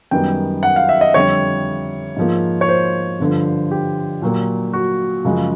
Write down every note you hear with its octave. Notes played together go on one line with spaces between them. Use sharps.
F#2 D#3 G3 B3 G5
F#5
F5
E5
D#5
F2 D3 G3 C#5
G#2 F3 A#3
C#5
C5
G2 D3 F3
G4
A#2 F#3 A#3
F#4
F#2 C#3 F3 G#3